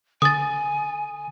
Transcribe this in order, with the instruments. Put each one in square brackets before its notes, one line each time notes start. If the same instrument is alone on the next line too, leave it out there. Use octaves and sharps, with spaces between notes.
[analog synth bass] D3 [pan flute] G#5 [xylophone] D#6 A6